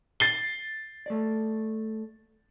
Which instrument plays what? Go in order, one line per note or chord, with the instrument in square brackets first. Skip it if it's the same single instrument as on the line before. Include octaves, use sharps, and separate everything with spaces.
[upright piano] A6 C7 G7
[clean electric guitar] A3 D5